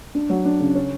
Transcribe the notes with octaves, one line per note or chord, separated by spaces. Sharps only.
D4
F#3
D4
C#3
C#4